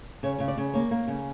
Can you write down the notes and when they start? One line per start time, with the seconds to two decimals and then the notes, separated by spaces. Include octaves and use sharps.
0.23 C#3 C#5
0.38 C#3 C#5
0.48 D5
0.58 C#3
0.74 A#3 C#5
0.91 A#3
1.08 C#3